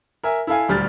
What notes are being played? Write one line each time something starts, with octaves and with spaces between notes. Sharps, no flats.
A#4 E5 G#5
E4 A4 F5 G#5
D#1 D2 G3 F6 A6